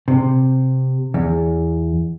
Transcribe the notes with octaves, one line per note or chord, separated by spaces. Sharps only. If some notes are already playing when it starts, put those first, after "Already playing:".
C3
E2